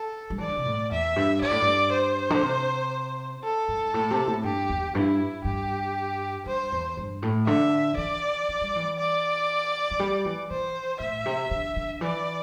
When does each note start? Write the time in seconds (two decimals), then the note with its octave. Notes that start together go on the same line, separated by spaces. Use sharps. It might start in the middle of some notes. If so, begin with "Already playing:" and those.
Already playing: A4
0.30 G3
0.38 E3 D5
0.49 D3
0.57 C3
0.66 A2
0.91 E2 E5
1.16 G2
1.41 G2 D5
1.51 A2
1.61 G2
1.92 C5
2.30 D3
2.42 C3
3.44 A4
3.68 G2
3.94 A2
4.11 C3
4.27 A2
4.44 G2 G4
4.70 E2
4.95 G2 E4
5.45 G2 G4
6.46 G2 C5
6.72 E2
6.97 G2
7.22 A2
7.47 D3 E5
7.97 E3 D5
8.49 E3
8.61 G3
8.76 E3
8.99 D5
9.91 E3
9.99 G3
10.25 E3
10.50 E3 C5
11.00 A2 E5
11.26 C3
11.51 D3
11.76 D3
12.01 E3 D5